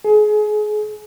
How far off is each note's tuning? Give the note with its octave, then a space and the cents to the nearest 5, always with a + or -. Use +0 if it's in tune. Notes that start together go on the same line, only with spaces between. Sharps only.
G#4 +30